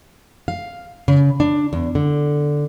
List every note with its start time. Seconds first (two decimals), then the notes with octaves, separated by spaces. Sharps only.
0.48 F5
1.08 C#3
1.40 D4
1.73 E2
1.95 D3